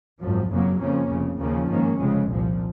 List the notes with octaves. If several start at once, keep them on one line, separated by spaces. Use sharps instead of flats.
G#1 F#2 F3
F#1 F2 C#3 F#3 A#3
F2 C#3 F3 A#3 C#4
F1 F2 C#3
D#2 C#3 F3 A#3 C#4
G#2 D#3 A#3 C#4
F1 F2 C#3 G#3
C2 A#2 F3